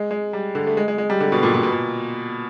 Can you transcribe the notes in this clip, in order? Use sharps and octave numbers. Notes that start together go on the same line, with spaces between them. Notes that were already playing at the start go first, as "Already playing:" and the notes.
Already playing: G#3
G#3
G3
D3
A3
G#3
G#3
G#3
G3
D3
B2
A#2
A#2
B2
A#2